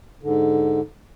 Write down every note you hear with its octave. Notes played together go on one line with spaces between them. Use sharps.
G#2 D3